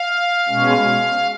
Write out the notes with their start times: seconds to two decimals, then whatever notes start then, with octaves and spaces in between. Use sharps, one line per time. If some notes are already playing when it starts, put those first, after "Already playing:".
Already playing: F5
0.48 B2 G#3 C#4